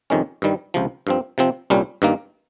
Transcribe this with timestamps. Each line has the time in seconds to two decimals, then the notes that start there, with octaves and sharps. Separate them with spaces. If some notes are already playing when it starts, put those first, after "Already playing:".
0.10 F2 C3 D#3 G#3 C#4
0.42 G2 D#3 G3
0.74 C#2 C3 F3
1.07 G2 F3 C4
1.38 C3 F3 C4
1.70 C2 A#2 G3 C#4
2.02 G2 D#3 A#3